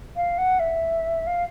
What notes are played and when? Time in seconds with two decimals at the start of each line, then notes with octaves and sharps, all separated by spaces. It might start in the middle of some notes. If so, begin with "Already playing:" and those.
0.16 F5
0.38 F#5
0.59 E5
1.27 F5